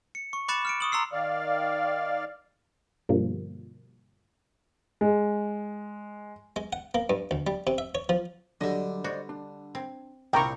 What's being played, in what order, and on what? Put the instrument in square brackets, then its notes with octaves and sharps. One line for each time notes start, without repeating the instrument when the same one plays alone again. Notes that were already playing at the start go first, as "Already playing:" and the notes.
[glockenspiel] C#7
C#6
B5 D6 F#6 A6 C#7 E7
F6 C#7 D7
C#6 D#6 F#7
A#5 C6 E6 C7
[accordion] D#3 D5 F5
[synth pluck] G2 B2 D3 F3 G3 A#3
[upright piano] G#3
[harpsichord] G#3
F#5
A#3
G2
D2
G3
C3
E5
C#5
F3
[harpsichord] D3 G3 [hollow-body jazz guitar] F#3 D4 [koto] D#5 E5
[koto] F#4 [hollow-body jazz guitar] C5 D5 D#5
[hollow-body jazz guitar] D4
[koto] C4
[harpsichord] C2 A#2 [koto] A#3 E4 [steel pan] G5 A#5 C#6